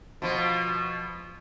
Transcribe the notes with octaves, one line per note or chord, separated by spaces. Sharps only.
B2 F3